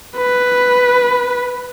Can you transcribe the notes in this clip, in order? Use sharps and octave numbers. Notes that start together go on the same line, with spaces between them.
B4